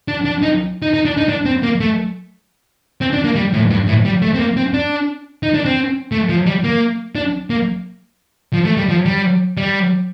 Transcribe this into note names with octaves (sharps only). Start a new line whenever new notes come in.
D4
D4
D#4
D#4
D#4
D4
D#4
D4
C4
A#3
A3
C4
D4
A#3
G3
A2
G2
A2
G3
A3
C4
A#3
C4
D4
D#4
D4
C4
A3
F3
G3
A#3
D4
A#3
F3
A3
G3
F3
G3
G3